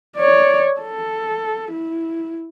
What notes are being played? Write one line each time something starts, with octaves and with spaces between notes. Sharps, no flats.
C#5 D5
A4
E4